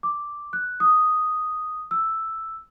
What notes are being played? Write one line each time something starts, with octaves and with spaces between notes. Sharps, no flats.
D6
F#6
D#6
E6